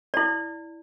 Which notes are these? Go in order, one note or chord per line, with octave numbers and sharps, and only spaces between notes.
E4 D5